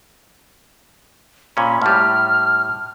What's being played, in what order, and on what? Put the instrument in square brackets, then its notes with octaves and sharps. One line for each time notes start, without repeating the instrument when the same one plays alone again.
[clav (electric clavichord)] A#2 C#4 [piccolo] B5
[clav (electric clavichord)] A2 G3 [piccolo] F6